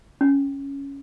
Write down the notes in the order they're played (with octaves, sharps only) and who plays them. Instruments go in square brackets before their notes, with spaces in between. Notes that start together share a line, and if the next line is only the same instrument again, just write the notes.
[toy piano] C#4